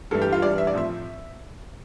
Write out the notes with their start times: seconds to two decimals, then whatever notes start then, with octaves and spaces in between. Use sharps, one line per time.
0.11 G2 E3 G3 A4
0.22 G4
0.32 F4
0.42 G2 E3 G3 D5
0.58 E5
0.67 D5
0.73 A2 F3 C4 E5